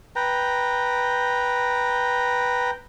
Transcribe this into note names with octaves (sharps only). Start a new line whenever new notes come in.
B4 G5 A#5